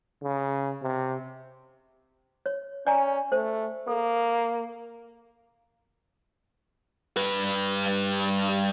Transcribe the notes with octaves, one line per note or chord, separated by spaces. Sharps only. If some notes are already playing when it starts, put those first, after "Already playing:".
C#3
C3
C#5
C#4 D5 G#5 A#5
A3 C5
A#3 A4
G2 B4